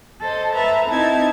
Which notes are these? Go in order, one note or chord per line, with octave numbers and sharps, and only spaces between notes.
A4 C5 D#5
A4 B4 E5 A5 A#5
C4 D#4 E4 A5 G#6